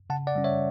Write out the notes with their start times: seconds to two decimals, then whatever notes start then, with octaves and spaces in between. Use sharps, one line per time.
0.10 C#3 F#5 A5
0.27 D5 F#5
0.35 G3 C#4
0.44 C#5 E5